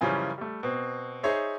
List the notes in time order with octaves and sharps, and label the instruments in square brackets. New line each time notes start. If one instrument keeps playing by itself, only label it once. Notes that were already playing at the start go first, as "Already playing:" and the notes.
[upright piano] F#2 C#3 E3 F3 G3 C#4
G3 A3
B2 C4
D#4 G#4 C5 C#5 E5